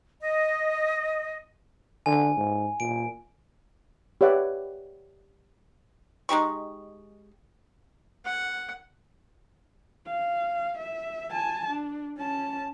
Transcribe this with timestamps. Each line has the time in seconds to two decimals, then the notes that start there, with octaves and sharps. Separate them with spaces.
0.21 D#5
2.06 D3 G#5
2.37 G#2
2.80 A#2 D7
4.21 G4 B4 C#5 D5 E5 F#5
6.29 G#3 D#4 G4 C#6
8.25 F#5
10.07 F5
10.78 E5
11.31 G#5 A5
11.70 D4
12.18 C#4 A5